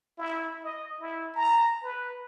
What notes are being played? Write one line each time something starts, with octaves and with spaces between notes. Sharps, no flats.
E4
D#5
E4
A#5
B4